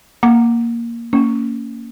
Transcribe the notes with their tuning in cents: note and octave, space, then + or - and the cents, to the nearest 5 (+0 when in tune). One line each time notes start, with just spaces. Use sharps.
A#3 +0 F#5 +0 D6 +0
A#3 -20 C#4 +10